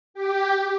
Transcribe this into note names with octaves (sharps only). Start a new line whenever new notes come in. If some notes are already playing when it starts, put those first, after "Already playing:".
G4